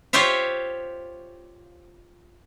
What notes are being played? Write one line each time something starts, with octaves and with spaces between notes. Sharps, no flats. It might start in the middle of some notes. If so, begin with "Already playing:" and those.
F4 G4 C5 C#5 E5 F5